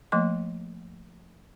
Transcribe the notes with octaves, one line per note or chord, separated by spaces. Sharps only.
F3 A3 A#3 D#5 C6